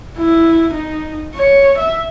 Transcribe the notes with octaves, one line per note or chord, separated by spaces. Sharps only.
E4
D#4
C#5
E5